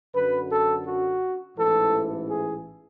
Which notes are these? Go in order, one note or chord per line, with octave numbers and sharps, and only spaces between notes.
F#2 D3 F#3 B4
A4
F#4
A1 G#2 E3 A4
G#4